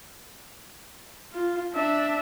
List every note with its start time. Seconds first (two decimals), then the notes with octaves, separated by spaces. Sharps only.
1.33 F4
1.74 D4 E5